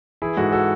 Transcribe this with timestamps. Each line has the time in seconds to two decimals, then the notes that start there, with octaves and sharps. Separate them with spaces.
0.22 E3 E4 G#4
0.37 G#2 F#4 A4
0.52 F#4 A4